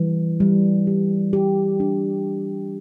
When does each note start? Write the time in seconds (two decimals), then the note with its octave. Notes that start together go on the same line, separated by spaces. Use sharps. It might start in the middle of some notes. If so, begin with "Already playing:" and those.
Already playing: E3 G3
0.40 G3
0.87 G4
1.33 G4
1.80 D4